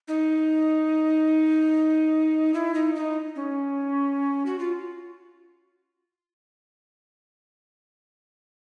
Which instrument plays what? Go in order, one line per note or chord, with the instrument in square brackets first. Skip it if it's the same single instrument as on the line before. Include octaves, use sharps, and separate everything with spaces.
[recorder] D#4
E4
D#4
D#4
C#4
F#4
F4